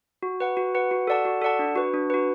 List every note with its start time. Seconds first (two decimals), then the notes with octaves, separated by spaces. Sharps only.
0.23 F#4
0.40 B4 F#5
0.57 F#4
0.75 B4 F#5
0.91 F#4
1.07 A4 D5 F#5 A5
1.25 F#4
1.41 A4 D5 F#5 A5
1.59 D4
1.76 F#4 B4
1.94 D4
2.10 F#4 B4